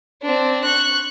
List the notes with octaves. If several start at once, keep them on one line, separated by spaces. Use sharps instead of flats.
C4 D4
C#6 F#6